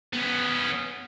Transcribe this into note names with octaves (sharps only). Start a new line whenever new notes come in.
B3 C#4